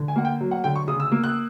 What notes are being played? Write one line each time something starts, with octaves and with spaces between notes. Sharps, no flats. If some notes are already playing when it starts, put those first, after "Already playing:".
Already playing: D3
G#5
A#3 F#5
G5
F#3
F#5
D3 G5
C#6
C#3 D#6
E6
A#3
F#6